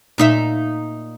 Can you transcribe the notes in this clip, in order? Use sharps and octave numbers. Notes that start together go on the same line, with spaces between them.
A#2 D#4 E5